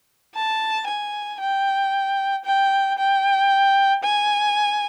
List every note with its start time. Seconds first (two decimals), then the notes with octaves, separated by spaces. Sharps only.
0.35 A5
0.88 G#5
1.40 G5
2.45 G5
2.98 G5
4.03 G#5